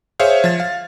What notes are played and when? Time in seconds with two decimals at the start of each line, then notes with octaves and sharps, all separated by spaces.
0.20 G#4 C5 C#5 E5 F5
0.44 F3 A6
0.60 F5